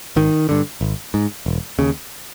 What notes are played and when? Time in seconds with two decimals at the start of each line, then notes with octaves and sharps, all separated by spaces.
0.16 G#1 D#3
0.49 G2 D3
0.81 G#1
1.14 G#2
1.46 E1
1.79 D#2 C#3